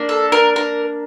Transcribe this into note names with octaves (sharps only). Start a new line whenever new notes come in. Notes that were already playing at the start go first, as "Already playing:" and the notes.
Already playing: A#3 D4
A4
A#4
A#4